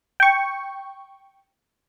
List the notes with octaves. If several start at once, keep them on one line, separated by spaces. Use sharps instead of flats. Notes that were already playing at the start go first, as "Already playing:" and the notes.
G5 C#6